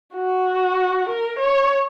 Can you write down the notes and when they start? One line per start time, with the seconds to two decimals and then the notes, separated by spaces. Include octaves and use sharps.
0.14 F#4
1.09 A#4
1.39 C#5